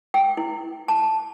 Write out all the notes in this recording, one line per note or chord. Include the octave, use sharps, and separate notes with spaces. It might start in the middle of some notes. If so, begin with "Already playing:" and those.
G5
E4
A5